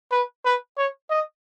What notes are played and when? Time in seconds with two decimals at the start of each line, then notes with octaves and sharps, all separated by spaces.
0.12 B4
0.45 B4
0.77 C#5
1.10 D#5